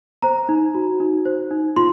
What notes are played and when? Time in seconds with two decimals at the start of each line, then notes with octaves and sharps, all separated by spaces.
0.22 C5 A#5
0.49 D#4
0.75 F#4
1.00 D#4
1.25 C5
1.51 D#4
1.76 F4 C6